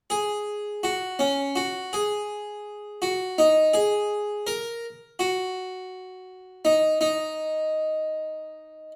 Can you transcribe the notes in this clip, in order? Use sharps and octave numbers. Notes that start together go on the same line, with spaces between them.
G#4
F#4
C#4
F#4
G#4
F#4
D#4
G#4
A#4
F#4
D#4
D#4